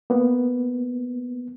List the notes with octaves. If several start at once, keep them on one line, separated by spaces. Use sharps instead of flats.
A#3 B3